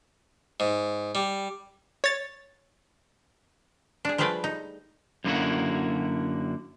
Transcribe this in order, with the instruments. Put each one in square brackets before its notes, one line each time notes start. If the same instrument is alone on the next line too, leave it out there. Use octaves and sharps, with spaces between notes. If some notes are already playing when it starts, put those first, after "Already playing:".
[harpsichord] G#2
G3
[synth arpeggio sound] C#5 A6
[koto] D4 G#4
F3 G3 A3 G#4 B4 D5
D#4
[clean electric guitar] F#2 D3 A#3 B3 E4 F#4